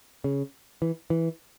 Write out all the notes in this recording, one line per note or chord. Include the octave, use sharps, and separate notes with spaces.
C#3
E3
E3